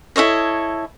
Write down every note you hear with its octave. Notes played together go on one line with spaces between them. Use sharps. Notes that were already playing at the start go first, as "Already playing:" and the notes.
E4 A4 C#5 D#5